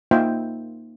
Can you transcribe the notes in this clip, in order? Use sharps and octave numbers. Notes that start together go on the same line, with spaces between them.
A#3 D#4 F4 C5 E5 G5